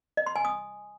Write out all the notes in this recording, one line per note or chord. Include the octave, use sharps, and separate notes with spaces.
D#5
C6
G#5
D#6